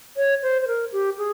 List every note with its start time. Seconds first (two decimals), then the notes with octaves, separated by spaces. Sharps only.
0.17 C#5
0.43 C5
0.62 C5
0.68 A#4
0.92 G4
1.18 G#4